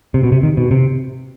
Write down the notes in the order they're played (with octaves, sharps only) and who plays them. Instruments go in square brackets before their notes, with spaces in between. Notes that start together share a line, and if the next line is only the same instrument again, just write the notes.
[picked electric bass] C3
B2
C3
D#3
B2
C3